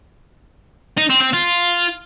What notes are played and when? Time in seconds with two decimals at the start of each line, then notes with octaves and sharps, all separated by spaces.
0.98 D#4
1.10 C4
1.22 C4
1.34 F4